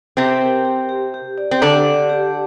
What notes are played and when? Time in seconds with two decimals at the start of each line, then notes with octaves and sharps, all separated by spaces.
0.17 C3 C4 G4
0.41 A#4
0.65 G4
0.89 G4
1.14 G4
1.38 D5
1.51 C4
1.62 D3 D4 G4
1.86 D5
2.09 G4